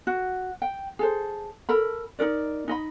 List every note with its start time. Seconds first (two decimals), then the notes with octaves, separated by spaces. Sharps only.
0.07 F#4
0.62 G5
0.99 G#4 A4 C5
1.69 A4 A#4 B5
2.19 D#4 F4 A#4 D5
2.68 D#4 D#5 B5